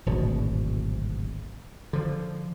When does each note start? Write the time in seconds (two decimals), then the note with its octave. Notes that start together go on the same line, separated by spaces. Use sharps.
0.06 D1 G#1 B2
1.93 D3 F3